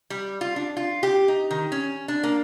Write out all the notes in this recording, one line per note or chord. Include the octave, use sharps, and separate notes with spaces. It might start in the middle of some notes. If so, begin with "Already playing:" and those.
G3
F4
D4
F4
G4
D#4
D#3
C#4
D4
A#3